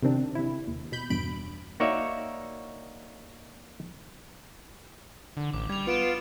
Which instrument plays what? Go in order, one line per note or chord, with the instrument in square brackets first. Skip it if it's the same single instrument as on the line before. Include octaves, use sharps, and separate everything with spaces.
[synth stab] C3 D#3 C4 D4
C3 E4
D#2
B2 B5 G6
E2 G2 B2 B5 D7
[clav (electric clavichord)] A#3 D#4 F#4 C#5 D5 E5
[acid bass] D3
[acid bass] A1 [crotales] D6
[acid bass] G3 [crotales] G#6 F7
[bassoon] B3 [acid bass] F4 [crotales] C#7 D7 E7